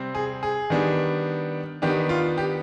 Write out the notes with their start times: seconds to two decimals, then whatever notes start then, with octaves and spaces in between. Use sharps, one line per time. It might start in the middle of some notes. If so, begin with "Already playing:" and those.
Already playing: C3 G3 C4
0.15 G#4
0.43 G#4
0.70 D#3 G3 B3 D4
1.82 D#3 B3 D4 G4
2.09 F4
2.38 G4